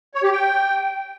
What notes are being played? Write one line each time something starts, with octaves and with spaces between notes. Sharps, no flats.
C#5
G4
G5